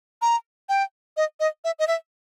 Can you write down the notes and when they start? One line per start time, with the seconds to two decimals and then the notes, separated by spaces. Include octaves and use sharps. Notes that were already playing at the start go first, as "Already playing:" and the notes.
0.22 A#5
0.69 G5
1.17 D#5
1.40 D#5
1.64 E5
1.79 D#5
1.87 E5